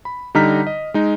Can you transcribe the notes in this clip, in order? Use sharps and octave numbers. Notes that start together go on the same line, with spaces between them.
B5
D3 G3 D#4 A#5 F6 B6
D#5
G#3 D#4